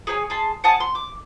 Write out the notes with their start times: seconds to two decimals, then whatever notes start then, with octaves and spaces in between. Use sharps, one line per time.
0.07 G#4 A4 C#5 G#5
0.30 G#4 A5 C6
0.64 F#5 G#5 A5 D#6
0.80 C6
0.95 D6